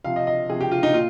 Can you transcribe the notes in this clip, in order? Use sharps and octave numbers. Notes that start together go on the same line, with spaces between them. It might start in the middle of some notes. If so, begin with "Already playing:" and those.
C3 F3 F5
D#5
D#5
C3 F3 G#4
G4
F4
D#4
A#2 F4